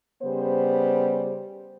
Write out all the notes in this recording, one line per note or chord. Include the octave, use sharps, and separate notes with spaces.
C#3 G3 B3 C5